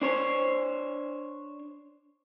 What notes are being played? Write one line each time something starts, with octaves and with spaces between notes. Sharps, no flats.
D4 C5 C#5